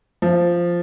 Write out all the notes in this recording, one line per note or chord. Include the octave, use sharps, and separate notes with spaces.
F3